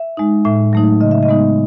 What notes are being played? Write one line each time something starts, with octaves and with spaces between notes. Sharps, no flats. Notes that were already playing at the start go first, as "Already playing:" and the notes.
Already playing: E5
G#3 D#4
A2 E5
F#3 A3 D#4
C#3 D#5
E5
D#5
G#3 B3 D#4